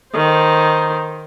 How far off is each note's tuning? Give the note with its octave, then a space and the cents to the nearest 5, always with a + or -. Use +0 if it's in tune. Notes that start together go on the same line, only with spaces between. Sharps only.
D#3 +0 C5 +0